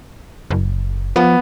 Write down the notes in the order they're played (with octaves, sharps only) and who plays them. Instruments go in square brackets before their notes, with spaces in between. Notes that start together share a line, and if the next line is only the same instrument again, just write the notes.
[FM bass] F#1
[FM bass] F3 [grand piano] B3